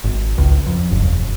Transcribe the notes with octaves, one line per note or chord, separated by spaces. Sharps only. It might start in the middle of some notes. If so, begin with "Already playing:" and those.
G#1
C#2
F2
F#1
E1